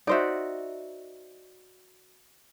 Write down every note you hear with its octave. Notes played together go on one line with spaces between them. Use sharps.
D#4 F#4 C5 D5 E5